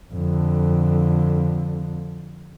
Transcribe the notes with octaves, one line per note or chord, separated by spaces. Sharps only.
F2 D3